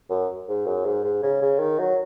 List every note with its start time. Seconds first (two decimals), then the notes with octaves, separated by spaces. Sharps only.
0.10 F#2
0.48 G#2
0.66 F#2
0.85 G#2
1.04 G#2
1.23 C#3
1.42 C#3
1.59 D#3
1.79 F#3